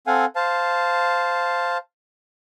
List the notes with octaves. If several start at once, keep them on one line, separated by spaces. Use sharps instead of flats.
C4 A4 F5 F#5 G#5
C5 F5 A5